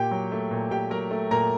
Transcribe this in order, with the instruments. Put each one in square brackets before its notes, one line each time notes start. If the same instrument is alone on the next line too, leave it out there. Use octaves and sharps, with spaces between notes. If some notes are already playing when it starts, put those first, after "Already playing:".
Already playing: [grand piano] A#2 G4 G5
F#3
A3
A#2
A#2 G4 G5
F#3 A#4 A#5
A3
A#2 A#4 A#5